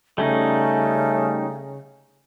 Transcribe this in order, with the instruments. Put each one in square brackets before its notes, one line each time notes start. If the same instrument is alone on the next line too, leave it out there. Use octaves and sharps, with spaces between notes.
[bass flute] C#3 [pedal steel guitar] G3 C#4 D#4 [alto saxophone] A3